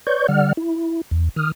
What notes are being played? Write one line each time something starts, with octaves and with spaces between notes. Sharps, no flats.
B4 C#5 D5 C#6 G6
D3 G3 D5 F#5 F6
E4
E2
D#3 D#6 F6